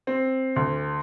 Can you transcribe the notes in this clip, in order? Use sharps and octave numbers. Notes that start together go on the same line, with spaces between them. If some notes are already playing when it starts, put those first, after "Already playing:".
C4
D2